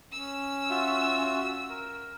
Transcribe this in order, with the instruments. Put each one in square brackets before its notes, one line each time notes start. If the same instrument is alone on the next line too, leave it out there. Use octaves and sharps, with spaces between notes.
[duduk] C#4 [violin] E6
[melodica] F4 F#4 E5
A#4